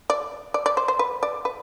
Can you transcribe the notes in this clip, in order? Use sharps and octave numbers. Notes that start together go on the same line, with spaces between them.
D5
D5
D5
C5
C5
B4
D5
B4